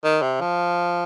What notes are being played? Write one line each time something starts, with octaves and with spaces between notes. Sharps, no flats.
D#3
C3
F3